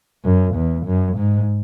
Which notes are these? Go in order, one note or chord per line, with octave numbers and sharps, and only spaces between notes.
F#2
E2
F#2
G#2